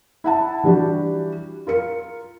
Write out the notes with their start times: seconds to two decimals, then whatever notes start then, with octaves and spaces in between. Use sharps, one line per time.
0.24 E4 F#5 A5
0.63 E3 G3 D4 F#4 G4
1.67 F4 A#4 C#7